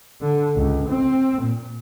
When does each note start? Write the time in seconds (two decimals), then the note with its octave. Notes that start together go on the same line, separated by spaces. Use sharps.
0.21 D3
0.56 C#2
0.89 C4
1.42 A#2